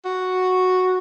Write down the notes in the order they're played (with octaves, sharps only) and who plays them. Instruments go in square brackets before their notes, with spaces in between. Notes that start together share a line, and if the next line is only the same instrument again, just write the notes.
[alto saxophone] F#4